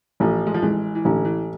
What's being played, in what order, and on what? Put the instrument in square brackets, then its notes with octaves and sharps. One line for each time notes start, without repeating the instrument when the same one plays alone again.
[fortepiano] A1 [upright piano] F3
[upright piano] G#3
F3
[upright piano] E3 [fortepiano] G#3
[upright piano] E3
[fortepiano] A1 [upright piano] D3
[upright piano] E3